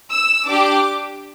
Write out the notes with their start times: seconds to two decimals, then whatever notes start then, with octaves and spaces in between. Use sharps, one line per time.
0.10 E6
0.47 D4 G4 D6